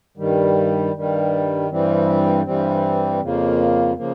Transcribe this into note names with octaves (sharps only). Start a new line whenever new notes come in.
G2 D#3 G3
G2 D#3 G3
G2 E3 G3 C4
G2 E3 G3 C4
F2 C#3 F3 A#3
C#3 F3 A#3